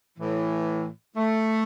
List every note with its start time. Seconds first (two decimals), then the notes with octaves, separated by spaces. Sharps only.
0.18 A2 E3
1.17 A3